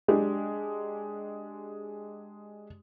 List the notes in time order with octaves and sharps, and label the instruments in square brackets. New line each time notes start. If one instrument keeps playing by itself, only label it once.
[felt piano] G#3 D4 G4